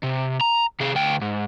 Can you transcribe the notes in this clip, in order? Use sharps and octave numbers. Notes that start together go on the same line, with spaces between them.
C3
A#5
C3 G#4
D2 G5
G#2